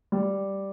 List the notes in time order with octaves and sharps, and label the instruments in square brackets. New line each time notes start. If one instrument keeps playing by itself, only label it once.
[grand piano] G3